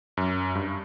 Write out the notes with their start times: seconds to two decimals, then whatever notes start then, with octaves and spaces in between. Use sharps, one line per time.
0.17 F#2
0.55 G2